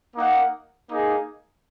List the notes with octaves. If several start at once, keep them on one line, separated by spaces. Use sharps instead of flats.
A#3 D#4 A#4 F#5
A#3 D#4 G#4